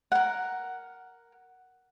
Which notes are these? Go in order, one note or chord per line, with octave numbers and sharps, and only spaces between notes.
A#4 F#5